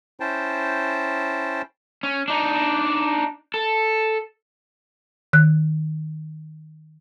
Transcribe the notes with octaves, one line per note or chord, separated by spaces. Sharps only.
C#4 E4 C5 G5 A5
C#4
D4 D#4
A4
D#3 F#6